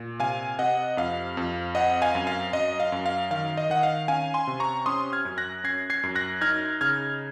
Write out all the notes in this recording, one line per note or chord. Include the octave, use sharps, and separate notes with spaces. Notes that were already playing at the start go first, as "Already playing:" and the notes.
Already playing: A#2
C3 F5 G#5
C3 D#5 F#5
F2 F5
F2
C4 D#5 F#5
F5 G#5
F#2
F5
F#2 D#5
F5
F#2
F5
D#3 F5
D#5
D#3 F#5
F5
C#4 F5 G#5
G#5 C6
C3
A#5 C#6
C#4 C6 D#6
F6 G#6
F#2
F#6 A#6
C#4 G#6 C7
G#6 C7
F#2
F#6 A#6
D#4 F6 G#6
C#3 F6 G#6